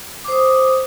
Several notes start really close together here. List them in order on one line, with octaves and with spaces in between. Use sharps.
D6 C5 D#6